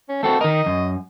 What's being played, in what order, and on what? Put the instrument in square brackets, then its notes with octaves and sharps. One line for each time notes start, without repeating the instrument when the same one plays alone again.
[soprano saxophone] C#4
[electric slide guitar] A3 C4 F#4 [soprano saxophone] A4
[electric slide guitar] D#3 A#4 [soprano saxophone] D#5
[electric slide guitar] F#2